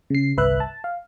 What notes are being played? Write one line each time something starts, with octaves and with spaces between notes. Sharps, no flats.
C#3 C7
G1 C2 B4 E5 F#6
A5
F5